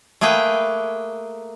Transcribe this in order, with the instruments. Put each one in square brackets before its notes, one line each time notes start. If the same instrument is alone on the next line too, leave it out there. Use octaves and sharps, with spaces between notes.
[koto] A3 A#3 G#4 B4 G5